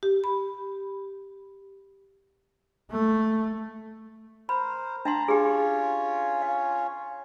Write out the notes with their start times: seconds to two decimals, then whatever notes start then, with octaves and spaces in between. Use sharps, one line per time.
0.03 G4
0.24 B5
2.92 A3
4.49 A#4 C5 B5
5.05 D4 F#5 A5 A#5 C6
5.28 C#4 F4 G4 G#4 C#5
6.42 F5